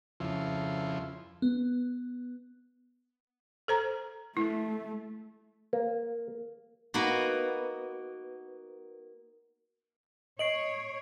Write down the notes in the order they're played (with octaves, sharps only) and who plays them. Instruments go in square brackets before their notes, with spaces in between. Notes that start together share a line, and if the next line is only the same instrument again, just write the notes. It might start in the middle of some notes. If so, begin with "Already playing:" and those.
[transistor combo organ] F2 C#3 F3 E4 C6
[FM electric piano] B3
[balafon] A4 C5 A#5
[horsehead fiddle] A3 [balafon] E4
[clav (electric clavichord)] A#3
[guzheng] A#3 B3 D#4 F#4
[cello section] C#5 [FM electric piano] D#5 [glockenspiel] C7 D7 F#7